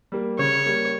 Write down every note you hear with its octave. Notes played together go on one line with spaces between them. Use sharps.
G3 A#3
C#3 C#5
G3 A#3